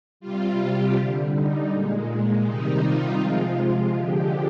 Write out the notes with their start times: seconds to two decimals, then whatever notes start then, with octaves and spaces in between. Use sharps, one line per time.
0.20 C3 G3 F4
0.58 G4
0.95 D3 G3
1.33 D#4
1.70 A#2 G#3
2.44 C3 D#3 G3 D#4
2.82 F4
3.18 C3 F3 G#3 F4
3.57 F4
3.93 D3 F3 G#3 G4